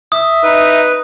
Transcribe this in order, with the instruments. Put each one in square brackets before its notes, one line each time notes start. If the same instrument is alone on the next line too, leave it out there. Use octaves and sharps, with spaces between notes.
[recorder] E5 [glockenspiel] D#6
[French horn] D#4 [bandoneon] B4